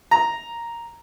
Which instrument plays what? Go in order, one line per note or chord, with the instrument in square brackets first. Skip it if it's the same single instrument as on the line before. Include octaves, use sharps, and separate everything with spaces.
[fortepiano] A#5